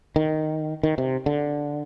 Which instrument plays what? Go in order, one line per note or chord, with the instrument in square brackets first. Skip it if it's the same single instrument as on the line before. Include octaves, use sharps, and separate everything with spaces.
[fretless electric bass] D#3
D#3
C3
D3